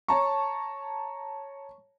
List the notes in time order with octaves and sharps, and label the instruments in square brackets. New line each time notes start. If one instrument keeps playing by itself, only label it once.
[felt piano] C#5 A5 A#5 [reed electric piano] C#6